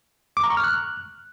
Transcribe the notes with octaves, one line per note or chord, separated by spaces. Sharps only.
D6
A#5
C#6
F6
F#6